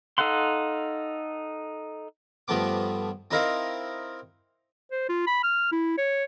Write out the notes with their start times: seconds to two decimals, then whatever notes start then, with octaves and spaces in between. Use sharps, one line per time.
0.18 D#4 A4 F5 F#5 C6
2.48 G2 F3 A3 B3 D6
3.31 C4 D#4 E4 A#4 D#5 F5
4.91 C5
5.09 F4
5.27 B5
5.43 F6
5.72 E4
5.98 C#5